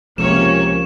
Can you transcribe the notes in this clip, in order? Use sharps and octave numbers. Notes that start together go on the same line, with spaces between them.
C#2 C3 F3 A#3 C#4 C#5 E7